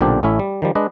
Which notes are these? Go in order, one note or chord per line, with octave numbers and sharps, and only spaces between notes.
B1 A#2 D3 C4 D4 G4
A1 A3 C#4 E4 E5
G3
D#3 F3 G3
G#3 D4 B4 D#5